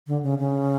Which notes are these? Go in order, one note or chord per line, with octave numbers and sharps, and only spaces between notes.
D3
C#3
C#3